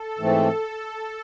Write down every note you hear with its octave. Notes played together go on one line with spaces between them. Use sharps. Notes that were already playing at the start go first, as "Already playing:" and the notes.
Already playing: A4
G#2 E3 A3 C4